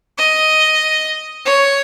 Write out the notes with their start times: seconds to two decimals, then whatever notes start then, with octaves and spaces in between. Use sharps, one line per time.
0.18 D#5
1.45 C#5